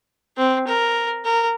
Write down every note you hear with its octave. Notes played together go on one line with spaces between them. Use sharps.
C4
A#4
A#4